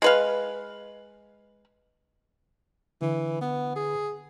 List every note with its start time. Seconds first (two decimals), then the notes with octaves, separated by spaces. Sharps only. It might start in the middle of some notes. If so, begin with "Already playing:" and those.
0.02 G#3 B4 F5
3.02 D3 E3
3.41 B3
3.76 G#4